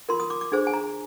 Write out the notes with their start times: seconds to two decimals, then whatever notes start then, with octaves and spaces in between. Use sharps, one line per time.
0.09 F4 A#4 C6
0.20 D#6
0.30 D6
0.41 D6
0.52 D4 G#4 C5
0.67 G#5
0.73 A#5